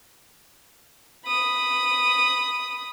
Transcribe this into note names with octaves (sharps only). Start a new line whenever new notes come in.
B5 D#6